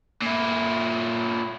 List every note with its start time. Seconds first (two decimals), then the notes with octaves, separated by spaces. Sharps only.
0.22 A#2 E4